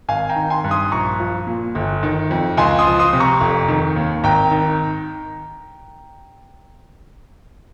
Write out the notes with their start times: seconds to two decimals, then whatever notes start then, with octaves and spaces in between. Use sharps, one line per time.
0.08 G#1 F5 G#5
0.29 G5 A#5
0.36 D#3
0.50 G#5 C6
0.64 G2
0.71 C6 D#6
0.92 A#1 A#5 C#6
1.20 F3
1.47 A#2
1.75 G1
2.03 D#3
2.31 F2
2.57 C#2 G#5 C6
2.79 C6 D#6
2.86 F3
2.99 C6 D#6
3.13 C3
3.20 A#5 C#6
3.41 F1
3.68 D#3
3.96 D#2
4.24 G#1 G5 A#5
4.51 D#3